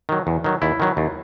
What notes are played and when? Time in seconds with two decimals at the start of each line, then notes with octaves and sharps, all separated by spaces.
0.09 D#3 F#3
0.27 E2
0.44 D#3 F#3
0.62 D#2 E4
0.80 D#3 F#3
0.97 D#2